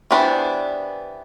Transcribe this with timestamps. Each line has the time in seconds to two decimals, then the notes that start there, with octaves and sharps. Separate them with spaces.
0.11 E3 B3 D4 G4 C5